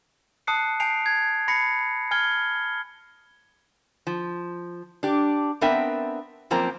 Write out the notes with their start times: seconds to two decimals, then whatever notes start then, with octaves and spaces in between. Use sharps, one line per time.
0.47 A5 D#6 F#6 C7 C#7
0.80 G#5 A5 G6 C7 D7 F7
1.06 G#6
1.48 B5 A#6 C7 C#7
2.11 G#5 F6 G#6 G7
4.07 F3
5.03 D4 G4
5.61 B3 C4 D4 A#4 E5 G5
6.51 F#2 F3 A#3 C4 A#5